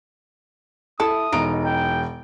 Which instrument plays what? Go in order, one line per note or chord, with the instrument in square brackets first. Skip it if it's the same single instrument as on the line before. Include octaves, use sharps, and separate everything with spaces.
[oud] E4 [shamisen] A4 [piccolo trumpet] D#6
[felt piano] E1 D7 [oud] D#4
[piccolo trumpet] G5